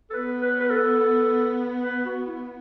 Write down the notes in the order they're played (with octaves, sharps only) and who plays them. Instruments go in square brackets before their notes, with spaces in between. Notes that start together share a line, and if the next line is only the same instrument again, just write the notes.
[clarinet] A4
[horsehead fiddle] B3 [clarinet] B4
[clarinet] B4
B4
A4
B4
F#4
E4